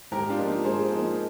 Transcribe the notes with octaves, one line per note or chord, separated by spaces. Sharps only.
G#2 G4 A#4
D4 F4
F3 A#3 D#4
G#2 G#4 C5
F3 A#3 D#4